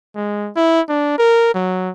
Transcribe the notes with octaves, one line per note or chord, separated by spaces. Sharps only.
G#3
E4
D4
A#4
F#3